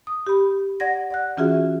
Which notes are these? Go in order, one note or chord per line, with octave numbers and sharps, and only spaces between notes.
D#6
G4 B5
D5 F#5 G#6 A#6
D5 F#5 F#6
E3 C#4 F4 F#4 G#4 E5